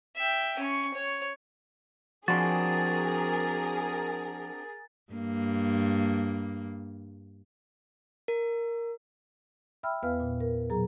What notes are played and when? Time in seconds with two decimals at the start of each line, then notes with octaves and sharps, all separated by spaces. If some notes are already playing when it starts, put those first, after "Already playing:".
0.17 E5 G5
0.59 C#4 C#6
0.94 C#5
2.28 F3 C4 D4 F#4 G#4 A#4 B5 A6
5.13 G2 A#3
8.28 A#4
9.83 E5 G5 B5 E6 F6
10.03 E2 B3 B4 F5 F6
10.20 A#2
10.40 A#4
10.70 B2 F#3 G#4 A#5